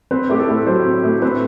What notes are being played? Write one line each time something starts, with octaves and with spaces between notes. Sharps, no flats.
C4 B4
A2 G4
A4
A2
F#3 C5
C4
A2
C4 B4